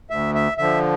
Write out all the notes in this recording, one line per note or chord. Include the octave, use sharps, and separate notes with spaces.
D2 E5
E5
D3 F3 E5